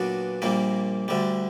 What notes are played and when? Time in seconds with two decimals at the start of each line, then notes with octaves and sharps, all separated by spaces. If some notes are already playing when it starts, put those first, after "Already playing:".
Already playing: A#2 F#3 B3 D4 F#4
0.42 A#1 A#2 G3 A#3
1.08 D2 D3 G3